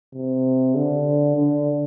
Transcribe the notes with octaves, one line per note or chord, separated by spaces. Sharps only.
C3
D3
D3